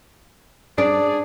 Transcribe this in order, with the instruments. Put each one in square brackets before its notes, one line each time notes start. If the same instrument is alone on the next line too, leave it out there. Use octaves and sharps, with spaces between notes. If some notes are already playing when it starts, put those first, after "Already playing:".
[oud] D4 [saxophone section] G#4 D5